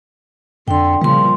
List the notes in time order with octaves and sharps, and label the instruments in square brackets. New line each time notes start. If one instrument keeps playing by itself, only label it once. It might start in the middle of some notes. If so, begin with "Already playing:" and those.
[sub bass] F2 [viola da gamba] D3 [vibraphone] G5 C6
[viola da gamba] A#2 F3 [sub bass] C#3 [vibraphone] G3 C6